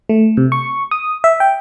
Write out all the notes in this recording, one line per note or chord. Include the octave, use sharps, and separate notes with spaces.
A3
C3
C#6
D#6
E5
G5